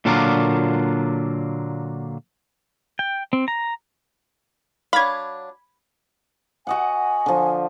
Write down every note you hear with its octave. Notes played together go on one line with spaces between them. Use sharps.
A#2 D3 F#3 A#3 D4 F4
G5
C4
A#5
F#3 D4 F5 B5 G#6
F#4 D#5 F#5 G#5
D3 F3